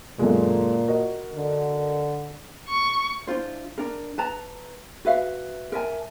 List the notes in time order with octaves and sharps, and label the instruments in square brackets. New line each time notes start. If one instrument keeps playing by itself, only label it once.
[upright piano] F#2 D3 G#3 [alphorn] A#2
[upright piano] F#4 A#4 D#5
[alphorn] D3
[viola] C#6
[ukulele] D4 E4 F4 C5
D4 A#4
B4 A5 A#5
F#4 B4 E5 F5
A#4 E5 G#5 A5